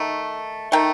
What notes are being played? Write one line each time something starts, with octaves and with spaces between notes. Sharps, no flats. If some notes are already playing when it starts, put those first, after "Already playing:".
Already playing: D#3 A3
D#3 A3 G5